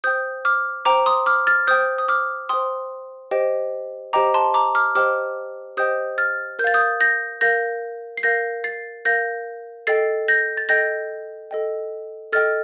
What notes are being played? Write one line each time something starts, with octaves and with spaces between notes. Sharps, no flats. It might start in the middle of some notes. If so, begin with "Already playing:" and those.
C5 G5 D#6 G6
D6 F6
C5 G5 A#5 D6
C6 D#6
D6 F6
F6 A6
C5 G5 D#6 G6
D#6
D6 F6
C5 G5 C6 D#6
G4 C5 D#5 G5
G4 C5 D#5 G5 A#5 D6
A5 C6
A#5 D6
D6 F6
G4 C5 D#5 G5 D6 F6
G4 C5 D#5 G5 D#6 G6
F6 A6
A#4 G6
F5 A6
D#6 G6
G6 A#6
A#4 F5 G6 A#6
C7
A#4 F5 G6 A#6
A6 C7
A#4 F5 G6 A#6
A4 D#5 G5 A6 C7
G6 A#6
A6
A4 D#5 G5 G6 A#6
A4 D#5 G5
A4 D#5 G5 F6 A6